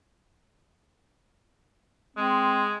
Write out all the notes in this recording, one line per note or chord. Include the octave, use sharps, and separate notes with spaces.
G#3 C4